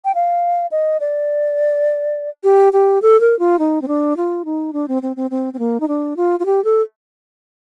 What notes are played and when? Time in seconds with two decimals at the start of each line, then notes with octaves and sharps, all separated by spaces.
0.05 G5
0.15 F5
0.72 D#5
1.00 D5
2.44 G4
2.73 G4
3.02 A4
3.20 A#4
3.39 F4
3.59 D#4
3.82 C4
3.88 D4
4.17 F4
4.45 D#4
4.73 D4
4.88 C4
5.02 C4
5.16 C4
5.31 C4
5.54 C4
5.59 A#3
5.80 D#4
5.88 D4
6.17 F4
6.40 F4
6.46 G4
6.64 A4